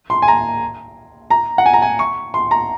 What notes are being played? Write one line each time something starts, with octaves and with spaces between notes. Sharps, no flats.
C6
G#5
A#5
A#5
F#5
G#5
A#5
G#5
C#6
C6
A#5